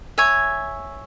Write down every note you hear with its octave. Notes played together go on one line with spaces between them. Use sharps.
C#5 E5 G#5